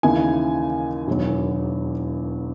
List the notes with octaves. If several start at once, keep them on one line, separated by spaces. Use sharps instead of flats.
D#2 C#3 E3 G#5
E1 E2 D#3 F#3